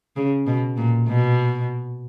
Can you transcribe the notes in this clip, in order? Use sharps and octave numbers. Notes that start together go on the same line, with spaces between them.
C#3
B2
A#2
B2